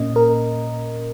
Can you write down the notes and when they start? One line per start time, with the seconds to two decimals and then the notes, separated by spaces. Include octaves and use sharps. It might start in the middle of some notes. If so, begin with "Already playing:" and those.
Already playing: A#2 A#3 C#4 D#5
0.16 A#4